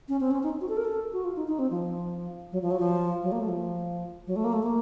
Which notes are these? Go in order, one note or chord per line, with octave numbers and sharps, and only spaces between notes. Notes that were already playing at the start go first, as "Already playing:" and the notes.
C#4
C4
C#4
D#4
F#4
A4
A#4
A4
F#4
F4
D#4
D#4
C4
F3
F#3
F3
F#3
F3
F#3
A#3
A3
F3
F#3
A3
A#3
A3
A#3